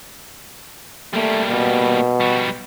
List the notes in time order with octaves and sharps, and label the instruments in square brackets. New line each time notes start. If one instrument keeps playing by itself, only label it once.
[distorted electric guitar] G3 A#3 [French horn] A3
[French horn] B2
[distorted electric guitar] G3 F#4